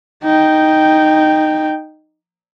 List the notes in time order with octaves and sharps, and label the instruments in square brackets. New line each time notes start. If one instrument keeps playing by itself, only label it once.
[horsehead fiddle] D#4 G5